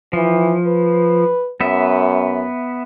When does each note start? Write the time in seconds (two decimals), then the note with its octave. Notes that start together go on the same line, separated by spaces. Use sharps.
0.13 E3 F3
0.67 B4
1.61 F#2 B3 E5